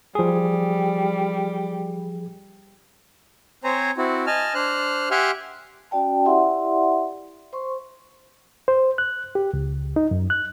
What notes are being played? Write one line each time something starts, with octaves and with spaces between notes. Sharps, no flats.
F3 G3 G#4
C4 C5 C#5 G#5 A#5
C4 E4 F#4
D#5 G#5 A5 F6
D4 C5 F6 F#6
G4 E5 F#5 G#5 C6 F6
C#4 F#4 D5 G5 A5
E4 G4 D5 E5 F#5 C6
C5 C6 C#6
C5
F#6
G4
C#2
D#4
F#2
F#6